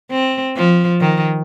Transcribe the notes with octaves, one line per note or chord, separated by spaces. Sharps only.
C4
F3
D#3